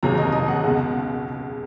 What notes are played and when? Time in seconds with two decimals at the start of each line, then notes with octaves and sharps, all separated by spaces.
0.03 F1 D#2 C#3 F#3 A#5
0.18 D#5
0.32 D#5
0.48 F#5
0.64 C#2 B2 G#3